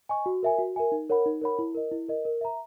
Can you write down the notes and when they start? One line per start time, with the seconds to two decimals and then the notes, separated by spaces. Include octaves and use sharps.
0.09 D#5 G#5 C#6
0.26 F#4
0.43 A#4 E5 G#5
0.58 F#4
0.76 A#4 E5 G#5
0.92 D#4
1.09 A#4 C#5 F#5 B5
1.26 D#4
1.41 A#4 C#5 F#5 B5
1.59 E4
1.75 A#4 D#5
1.91 E4
2.09 A#4 D#5
2.25 A#4
2.41 E5 A#5